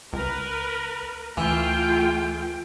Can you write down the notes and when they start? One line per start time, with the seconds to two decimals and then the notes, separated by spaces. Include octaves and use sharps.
0.13 C#2 A#4 B4
1.37 D2 E3 A3 F4 G5